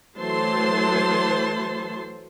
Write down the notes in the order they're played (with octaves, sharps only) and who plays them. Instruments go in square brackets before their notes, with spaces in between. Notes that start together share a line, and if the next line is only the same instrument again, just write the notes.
[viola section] E3 F#3 A3 C5 A5 C6